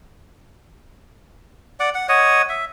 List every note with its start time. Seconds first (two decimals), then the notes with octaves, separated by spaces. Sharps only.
1.80 D5 F#5 D6
1.94 F#5
2.09 C#5 D#5 F#5
2.49 E5